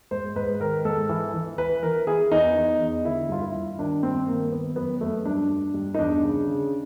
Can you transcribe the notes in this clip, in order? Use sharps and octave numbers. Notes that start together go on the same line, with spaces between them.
G#2 C5
G#2 B4
D#3 A#4
G#2 A4
E3
E3
E3 B4
E3 A#4
E3 G#4
E2 D#4
E2
E2
D3 E4
G2 F4
E4
G2
D#3 D4
G2 C4
D#3 A#3
D#3 B3
F#2 B3
F#2 A3
G2 D4
G2
G2
D#4
E2 D4
C#3
C#3